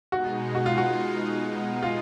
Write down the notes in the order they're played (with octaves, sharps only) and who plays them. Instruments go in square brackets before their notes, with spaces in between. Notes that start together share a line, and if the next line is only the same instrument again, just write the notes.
[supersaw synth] B2 G#3 D#4 [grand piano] F#4
[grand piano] F#4
F4
F#4
F4